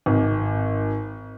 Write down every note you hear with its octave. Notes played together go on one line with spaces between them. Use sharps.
G#1